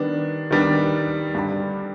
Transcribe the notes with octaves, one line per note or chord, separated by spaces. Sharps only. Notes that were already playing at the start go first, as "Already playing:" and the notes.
Already playing: D#3 G3 B3 D4
D#3 G3 B3 D4
G2 D3 G3